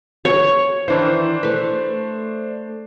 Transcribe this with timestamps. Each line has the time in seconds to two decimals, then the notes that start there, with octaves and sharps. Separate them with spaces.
0.25 C#5
0.88 D#3 E3 D4 E4 C5
1.43 A3 B4